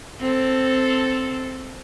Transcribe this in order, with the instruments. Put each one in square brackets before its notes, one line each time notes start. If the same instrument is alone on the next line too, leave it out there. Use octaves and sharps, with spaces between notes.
[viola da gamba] C4 A4